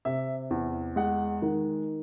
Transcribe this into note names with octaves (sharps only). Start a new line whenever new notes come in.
C3 E5
E2
G#3 F#5
D#3